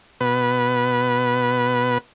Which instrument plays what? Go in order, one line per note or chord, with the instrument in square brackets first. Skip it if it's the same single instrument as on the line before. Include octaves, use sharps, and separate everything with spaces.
[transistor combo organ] B2 B4